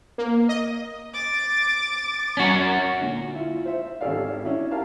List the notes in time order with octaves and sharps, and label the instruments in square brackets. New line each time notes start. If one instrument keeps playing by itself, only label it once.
[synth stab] A#3
D#5
[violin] D6 A6
[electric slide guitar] C#4 F#4
[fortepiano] A#2 D3
E4 F4
C5 E5
G#1 C#4 G4 A4 D5 F5
C#4 D4 E4 F#4
E4 G4 A#4 F5 A5